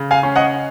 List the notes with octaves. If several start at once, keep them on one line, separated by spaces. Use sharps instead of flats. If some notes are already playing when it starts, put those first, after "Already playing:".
Already playing: C#3
F5 G#5
C#4
D#5 F#5